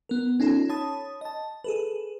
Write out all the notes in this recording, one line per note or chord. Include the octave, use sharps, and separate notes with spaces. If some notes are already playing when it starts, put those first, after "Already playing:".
B3 A#4
C#4 D#4 F4 A4
C#5 A5 B5 D#6
D#5 A5
G#4 A4 B4